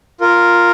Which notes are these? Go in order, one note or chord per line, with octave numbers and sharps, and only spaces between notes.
F4 A#4